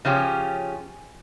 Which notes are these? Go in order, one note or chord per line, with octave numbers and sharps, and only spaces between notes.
C#3 F3 C#4 G4